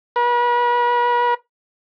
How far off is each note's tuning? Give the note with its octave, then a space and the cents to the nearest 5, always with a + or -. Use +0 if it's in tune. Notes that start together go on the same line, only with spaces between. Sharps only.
B4 -40